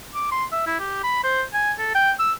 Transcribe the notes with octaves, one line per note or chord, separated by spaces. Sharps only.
D6
C6
E5
E4
G4
B5
C5
G#5
A4
G5
E6